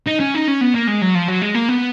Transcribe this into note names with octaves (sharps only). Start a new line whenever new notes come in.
D#4
C#4
D#4
C#4
B3
A#3
G#3
F#3
F3
F#3
G#3
A#3
B3